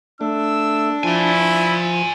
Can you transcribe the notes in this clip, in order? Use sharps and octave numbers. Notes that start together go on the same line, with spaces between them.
A3 D4 E6
F3 E4 D5 G#5